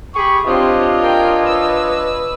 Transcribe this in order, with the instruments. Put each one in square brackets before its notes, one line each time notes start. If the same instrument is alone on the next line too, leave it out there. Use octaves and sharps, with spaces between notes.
[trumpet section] G4 B5 C#6 [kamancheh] G#4
[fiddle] C4 G4 [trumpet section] D4 C#5 D#5 [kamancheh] F4
[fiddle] A#4 G5
B4 E6